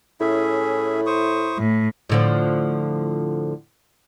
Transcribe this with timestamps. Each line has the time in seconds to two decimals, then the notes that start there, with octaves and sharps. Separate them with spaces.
0.21 A2 C#4 E4 G#4 E5
1.06 C5 C#6 D#6
1.58 A2
2.09 A2 D3 F3